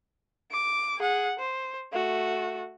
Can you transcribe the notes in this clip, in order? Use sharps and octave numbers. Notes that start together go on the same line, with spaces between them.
D6
G#4 F#5
C5
A3 F#4